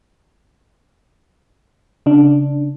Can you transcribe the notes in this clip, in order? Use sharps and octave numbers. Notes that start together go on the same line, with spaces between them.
C#3 D4